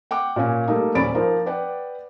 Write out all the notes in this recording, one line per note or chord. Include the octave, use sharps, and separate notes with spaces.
F#5 G5 D6
A#2 C#4 G#5
G3 A3 A#3 D#4
D#1 C#4 D5 B5 A6 D7
F3 D#4 A#4 C5
B4 D5 F#5 G5